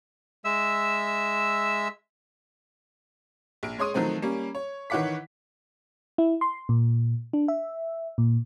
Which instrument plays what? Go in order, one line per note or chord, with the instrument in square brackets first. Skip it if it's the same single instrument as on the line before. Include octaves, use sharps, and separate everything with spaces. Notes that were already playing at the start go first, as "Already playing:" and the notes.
[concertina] G#3 E5 E6
[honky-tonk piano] A#1 D7
G#3 C#5 C6 D#6 D#7
D#3 F3 F#3 A3 C4
G3 A#3 C#4
C#5
D#3 E3 C#5 F#5 D6 B6
[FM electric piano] E4
C6
A#2
D4
E5
A#2